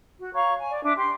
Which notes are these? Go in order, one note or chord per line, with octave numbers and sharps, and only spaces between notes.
F#4
C#5 F5 A#5 C#6
G#5
D5
D4 E5
G4 C6